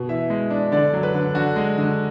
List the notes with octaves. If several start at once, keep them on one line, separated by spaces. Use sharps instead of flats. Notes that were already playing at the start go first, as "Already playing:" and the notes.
Already playing: B2
E3 E5
G#3
D4
D3 D5
F#3
B4
D3
D3 F#4
G#3
D3